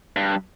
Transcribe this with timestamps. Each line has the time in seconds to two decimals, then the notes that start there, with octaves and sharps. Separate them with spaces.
0.16 G2